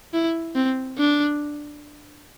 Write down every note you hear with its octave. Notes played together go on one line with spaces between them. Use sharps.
E4
C4
D4